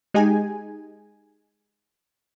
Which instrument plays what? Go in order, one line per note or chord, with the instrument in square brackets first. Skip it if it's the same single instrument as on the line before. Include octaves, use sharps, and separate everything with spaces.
[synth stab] G#3 D#4 G4 G#4 G#5